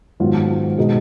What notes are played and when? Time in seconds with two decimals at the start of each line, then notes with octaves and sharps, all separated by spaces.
0.20 G#2 D#3 F#3 B3 F4
0.78 B2 G#3 D#4